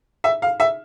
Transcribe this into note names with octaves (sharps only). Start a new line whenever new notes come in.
E5
F5
E5